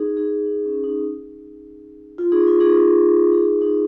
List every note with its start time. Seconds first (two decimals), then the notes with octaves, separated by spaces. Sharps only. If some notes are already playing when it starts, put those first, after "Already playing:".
Already playing: D#4 G#4
0.17 D#4 G#4
0.46 D#4
0.65 C#4
0.84 D#4
2.18 F4
2.32 D#4 G#4
2.47 F4
2.60 D#4 G#4
2.75 F4
3.32 D#4 G#4
3.61 D#4 G#4